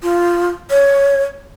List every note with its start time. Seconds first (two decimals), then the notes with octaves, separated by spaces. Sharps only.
0.03 F4
0.70 C#5